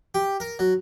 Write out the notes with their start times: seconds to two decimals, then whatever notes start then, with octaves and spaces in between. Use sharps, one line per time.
0.15 G4
0.40 A#4
0.59 F#3